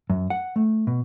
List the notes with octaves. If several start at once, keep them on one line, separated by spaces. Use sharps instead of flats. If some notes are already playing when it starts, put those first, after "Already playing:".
F#2
F#5
A3
B2